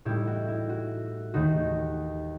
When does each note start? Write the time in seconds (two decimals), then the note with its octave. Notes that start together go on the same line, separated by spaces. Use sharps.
0.05 A2 G3 D#4 E4 G4
0.27 F#4
0.48 E4
0.69 F#4
1.34 D#2 D#3 A3 D#4 F#4